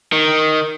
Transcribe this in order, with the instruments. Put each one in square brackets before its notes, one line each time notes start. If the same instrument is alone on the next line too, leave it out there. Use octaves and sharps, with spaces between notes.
[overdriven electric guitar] D#3